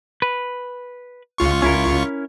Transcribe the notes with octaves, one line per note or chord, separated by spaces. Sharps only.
B4
C#2 F4 C#6
C#4 E4 A#4